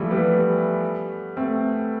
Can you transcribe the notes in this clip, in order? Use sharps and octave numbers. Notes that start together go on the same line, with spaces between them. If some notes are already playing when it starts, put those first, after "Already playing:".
Already playing: E3 F3 G3 A3
G3 B3
A3 C4